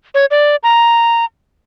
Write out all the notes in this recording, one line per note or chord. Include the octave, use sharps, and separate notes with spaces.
C#5
D5
A#5